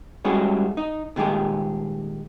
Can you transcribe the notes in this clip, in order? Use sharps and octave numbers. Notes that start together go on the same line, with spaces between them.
G3 G#3 C#4 E4 F#4 G#4
D#4
A#2 D#3 G#3 G4 G#4